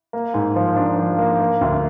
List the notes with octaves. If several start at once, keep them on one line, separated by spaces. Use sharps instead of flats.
A#3
G#2
F3
D4
F3
A#3
A#3
D2